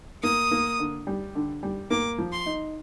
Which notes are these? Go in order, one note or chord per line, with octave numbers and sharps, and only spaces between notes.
A#3 D#6
A#3
D3
G3
D3
G3
A#3 D6
F3
C6
D#4